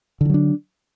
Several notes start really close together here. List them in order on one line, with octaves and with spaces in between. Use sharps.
D3 E3 F#3 D4